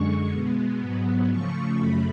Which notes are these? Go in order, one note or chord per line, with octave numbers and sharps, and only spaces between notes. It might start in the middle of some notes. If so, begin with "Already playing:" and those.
Already playing: F#2 D3 G#3 C#6
B2 G#3 B3
G#2 F#3 B3
C#3 F3 A3 C#6
F#2 C#3 F#3 A3 B5